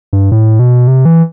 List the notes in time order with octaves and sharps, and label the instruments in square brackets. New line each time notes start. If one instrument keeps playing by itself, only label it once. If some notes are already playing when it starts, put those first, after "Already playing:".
[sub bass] G2
A2
B2
C3
E3